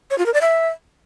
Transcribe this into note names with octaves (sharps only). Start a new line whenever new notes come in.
C#5
F4
A#4
D5
E5